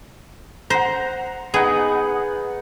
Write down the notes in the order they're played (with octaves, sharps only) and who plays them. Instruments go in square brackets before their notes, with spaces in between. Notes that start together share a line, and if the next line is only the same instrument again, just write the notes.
[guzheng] C5 [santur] F#5 A#5
[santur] B3 D#4 F#5 [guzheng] G#4